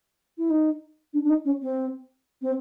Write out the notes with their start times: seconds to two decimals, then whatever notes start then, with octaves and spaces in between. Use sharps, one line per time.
0.38 E4
0.50 D#4
1.13 D4
1.24 D4
1.30 D#4
1.45 C#4
1.62 C4
2.42 C4